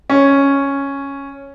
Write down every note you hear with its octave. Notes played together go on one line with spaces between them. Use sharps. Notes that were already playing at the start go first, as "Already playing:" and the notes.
C#4